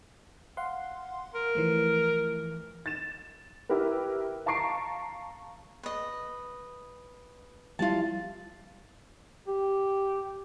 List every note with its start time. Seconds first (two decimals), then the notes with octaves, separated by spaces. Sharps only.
0.57 F5 F#5 C6
1.34 A#4
1.55 E3 F3 A3
2.86 A6 E7
3.69 E4 G4 A#4 B4
4.46 F5 A5 A#5 C#6 C7 D7
5.83 B4 D#5
7.79 F3 G3 E4 F4 A5
9.47 G4